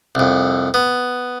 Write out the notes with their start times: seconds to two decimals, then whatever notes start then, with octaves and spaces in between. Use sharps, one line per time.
0.15 C2 F2
0.74 B3